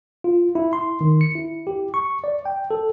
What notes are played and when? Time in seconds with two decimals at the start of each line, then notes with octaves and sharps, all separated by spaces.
0.24 F4
0.55 E4
0.73 C6
1.01 D#3
1.21 C#7
1.35 E4
1.67 G4
1.94 C#6
2.24 D5
2.45 G5
2.71 A4